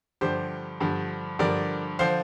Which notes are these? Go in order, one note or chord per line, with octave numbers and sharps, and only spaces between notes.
G2 D3 F3 G4 C5
G2 D3 F3
G2 D3 F3 A#4 D5
D3 F3 C5 F5